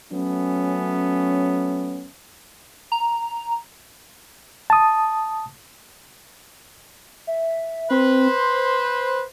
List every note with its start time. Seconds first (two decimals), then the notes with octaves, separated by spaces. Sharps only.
0.11 F#3 A3 B3 C#4
2.92 A#5
4.70 A5 D#6
7.27 E5
7.91 C4 B4 C5
8.39 C6